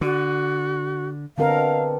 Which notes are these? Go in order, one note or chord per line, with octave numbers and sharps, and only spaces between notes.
D3 F#4
B2 D3 C4 D4 A4 A#4 F5